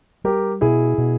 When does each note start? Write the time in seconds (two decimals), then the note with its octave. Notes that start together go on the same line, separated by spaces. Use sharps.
0.24 G3 G4 A#4
0.61 B2 E4 G#4
0.98 B2